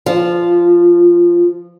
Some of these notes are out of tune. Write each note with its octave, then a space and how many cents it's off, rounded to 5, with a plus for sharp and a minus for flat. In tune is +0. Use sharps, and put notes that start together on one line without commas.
F3 -10